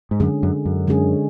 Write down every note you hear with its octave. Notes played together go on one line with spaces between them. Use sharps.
G#2
F#2 D3 G#3 C#4 G#4
F#2
F#2
D3 G#3 C#4 G#4